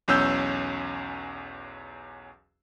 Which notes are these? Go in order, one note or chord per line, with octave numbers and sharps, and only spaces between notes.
B1 E2 C#4 E6 G6